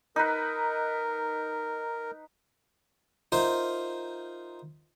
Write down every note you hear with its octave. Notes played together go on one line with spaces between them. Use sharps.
D#4 A#4 B4
D#4 F4 A#4 C5 E5